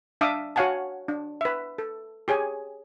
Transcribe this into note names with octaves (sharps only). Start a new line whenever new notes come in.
D4 E5 F5 A5 D6 D#6
F#4 C#5 F5 F#5 G#5 A5
D4
B4 E5
A4
G4 G#4 C#5 G#5